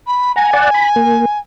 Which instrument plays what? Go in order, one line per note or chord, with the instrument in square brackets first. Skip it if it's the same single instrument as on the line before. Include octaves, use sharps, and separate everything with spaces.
[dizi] B5
[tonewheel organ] F#5 A#5 [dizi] G#5
[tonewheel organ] D5 F#5 A5
B5
A#3